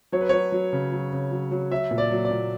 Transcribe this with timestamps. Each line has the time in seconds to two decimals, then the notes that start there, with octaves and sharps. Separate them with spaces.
0.12 F#3 C#5
0.21 B4
0.29 F#3 C#5
0.52 F#3
0.73 C#3
0.92 F#3
1.13 C#3
1.31 F#3
1.51 F#3
1.71 F#3 E5
1.91 A#2
1.98 D5
2.11 F#3
2.25 D5
2.31 A#2